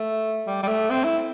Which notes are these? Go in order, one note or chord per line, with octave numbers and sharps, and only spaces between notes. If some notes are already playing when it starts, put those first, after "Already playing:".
Already playing: A3
G3
G3
A3
C4
E4